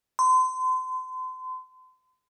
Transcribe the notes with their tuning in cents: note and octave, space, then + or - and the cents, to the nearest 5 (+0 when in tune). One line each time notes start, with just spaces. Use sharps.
C6 -35